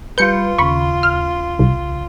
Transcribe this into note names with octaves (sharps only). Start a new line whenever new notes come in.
G3 F4 B4 G6 C#7
D#2 C#3 B5 C#6
F6
C2